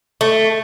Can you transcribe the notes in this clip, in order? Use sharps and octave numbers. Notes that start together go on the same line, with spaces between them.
A3